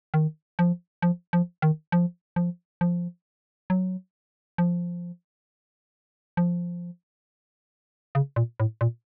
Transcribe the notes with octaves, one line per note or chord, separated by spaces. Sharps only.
D#3
F3
F3
F3
D#3
F3
F3
F3
F#3
F3
F3
C#3
A#2
A2
A#2